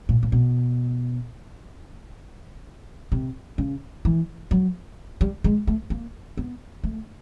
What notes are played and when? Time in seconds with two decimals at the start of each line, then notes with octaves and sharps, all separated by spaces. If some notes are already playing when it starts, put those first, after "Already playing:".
0.09 A#2
0.23 A#2
0.32 B2
3.12 C3
3.58 C#3
4.05 E3
4.51 F#3
5.21 G3
5.44 G#3
5.67 A3
5.90 A#3
6.37 B3
6.84 A3